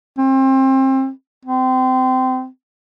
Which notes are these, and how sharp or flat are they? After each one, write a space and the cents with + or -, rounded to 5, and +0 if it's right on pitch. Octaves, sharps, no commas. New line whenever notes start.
C4 +30
C4 -25